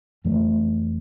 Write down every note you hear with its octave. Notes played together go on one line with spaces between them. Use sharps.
F2 E3 A3